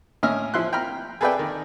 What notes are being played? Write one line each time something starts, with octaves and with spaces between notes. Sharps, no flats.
A2 C#4 D#5 E5 F6
F3 E4 C6 F#6
G5 A#5 B5 F6
G#4 A4 B4 D5 E5 G5
D#3